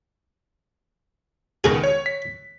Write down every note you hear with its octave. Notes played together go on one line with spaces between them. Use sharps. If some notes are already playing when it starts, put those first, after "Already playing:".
C#2 B2 D#3 G#4 B4 A#5
C#5
B6